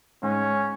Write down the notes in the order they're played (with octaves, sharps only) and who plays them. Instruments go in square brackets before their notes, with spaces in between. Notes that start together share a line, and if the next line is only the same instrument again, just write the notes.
[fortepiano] G#2 [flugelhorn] C#4